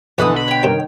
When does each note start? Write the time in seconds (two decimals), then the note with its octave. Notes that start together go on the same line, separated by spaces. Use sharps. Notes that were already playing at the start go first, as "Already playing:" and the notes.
0.18 A#1 B2 D3 E3 A4 B4 D#6
0.36 B5
0.48 C#5 G5
0.63 G2 C3 D#3